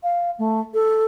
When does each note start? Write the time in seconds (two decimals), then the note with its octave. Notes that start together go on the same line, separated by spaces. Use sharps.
0.03 F5
0.39 A3
0.74 A4